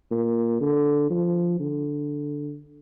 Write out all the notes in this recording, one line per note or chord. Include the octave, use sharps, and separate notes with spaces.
A#2
D3
F3
D3